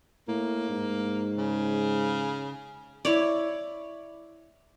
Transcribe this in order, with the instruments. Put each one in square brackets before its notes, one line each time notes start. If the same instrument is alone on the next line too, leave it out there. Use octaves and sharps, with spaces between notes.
[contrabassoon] A2 [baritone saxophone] A#3
[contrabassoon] G#2
[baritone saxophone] C#3
[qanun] E4 C#5 D5